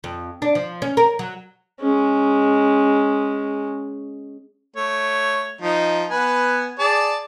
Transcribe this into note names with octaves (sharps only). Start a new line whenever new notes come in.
F2
D4
F3
C#4
A#4
F#3
G#3 C#4
A3 C#5
F3 D#4
B3 B4 G#5
G#4 D5 A5